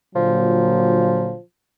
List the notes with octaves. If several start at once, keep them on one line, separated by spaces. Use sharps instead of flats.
A#2 D3 F3 F#3